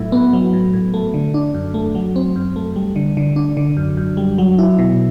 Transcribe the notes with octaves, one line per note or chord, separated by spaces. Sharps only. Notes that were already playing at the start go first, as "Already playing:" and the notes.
Already playing: A2 F#3 E4
B3
F#3
A2
A2
A3
D3
D4
F#2
A3
F#3
C4
F#2
A3
G3
D3
D3
D4
D3
F#2
F#2
G3
F#3
E4
B2